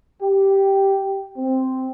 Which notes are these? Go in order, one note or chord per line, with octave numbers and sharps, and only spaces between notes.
G4
C4